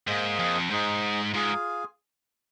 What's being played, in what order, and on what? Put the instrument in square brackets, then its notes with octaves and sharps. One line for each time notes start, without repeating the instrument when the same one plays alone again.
[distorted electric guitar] G#2 [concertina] A#3 G#4 C5 D#5 G#5
[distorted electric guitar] F2
[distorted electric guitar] G#2 [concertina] D#4 G#4 C5
[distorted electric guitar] G#2 [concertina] F4 G#4 F5 G#5